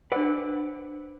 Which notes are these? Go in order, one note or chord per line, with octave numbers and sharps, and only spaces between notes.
D4 B4 C5 D5 F#5 E6